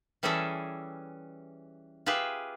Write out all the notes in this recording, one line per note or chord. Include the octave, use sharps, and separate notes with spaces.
E3 G3 C#4 G#4 A4 E5
F4 G4 G#4 B4 E5